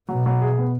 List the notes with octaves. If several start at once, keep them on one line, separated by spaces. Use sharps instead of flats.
B2 F#3
F#3
G#4
B3